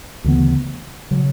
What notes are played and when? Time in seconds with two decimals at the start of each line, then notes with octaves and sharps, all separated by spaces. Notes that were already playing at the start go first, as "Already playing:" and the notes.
0.24 D2 C#3 E3 B3
1.11 C#3 F#3